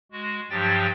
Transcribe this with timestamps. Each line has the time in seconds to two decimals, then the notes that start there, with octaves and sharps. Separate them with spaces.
0.12 G#3 F#4
0.50 G2 F3 F#3 G4 G5 A6